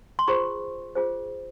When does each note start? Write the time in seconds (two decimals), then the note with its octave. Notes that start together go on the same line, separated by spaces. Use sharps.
0.19 C6
0.28 F4 G#4 C5 C#6
0.95 F4 G#4 C5